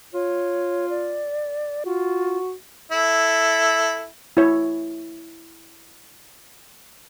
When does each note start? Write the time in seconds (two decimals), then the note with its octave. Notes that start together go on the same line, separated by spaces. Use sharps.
0.14 F4 C#5
0.89 D5
1.86 F4 F#4
2.91 E4 A4
4.37 E4 C#5